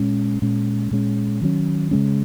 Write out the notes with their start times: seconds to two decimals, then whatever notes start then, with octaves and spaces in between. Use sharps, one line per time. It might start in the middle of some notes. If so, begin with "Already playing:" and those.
Already playing: A#2 G#3 C#4
0.42 A#2 G#3 C#4
0.91 A#2 G#3 C#4
1.41 D#3 F#3 C#4
1.91 C#3 G#3 C#4